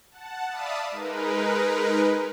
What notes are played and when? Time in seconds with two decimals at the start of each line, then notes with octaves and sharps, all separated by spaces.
0.11 F#5 A5
0.48 D5 E5 F5 A5 B5 D#6
0.91 G#3 D#4 A#4 B4